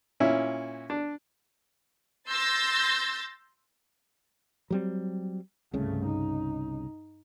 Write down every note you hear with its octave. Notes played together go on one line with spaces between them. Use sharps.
A#2 C#4 E4
D4
C6 E6 G6 A6 A#6
F#3 G3 C4
C2 G2 C#3 A3
D#4